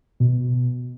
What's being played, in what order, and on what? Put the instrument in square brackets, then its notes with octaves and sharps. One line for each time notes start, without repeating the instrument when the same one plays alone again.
[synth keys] B2